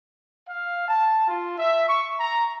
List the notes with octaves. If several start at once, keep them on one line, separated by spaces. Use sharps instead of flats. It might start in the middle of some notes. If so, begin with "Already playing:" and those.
F5
A5
F4
E5
C#6
A#5